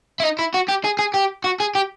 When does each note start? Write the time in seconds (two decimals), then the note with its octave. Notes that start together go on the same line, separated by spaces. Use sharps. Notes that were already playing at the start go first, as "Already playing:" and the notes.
0.20 E4
0.23 D#4
0.39 E4
0.54 F#4
0.68 G4
0.84 G#4
0.99 G#4
1.14 G4
1.44 F#4
1.60 G#4
1.75 G4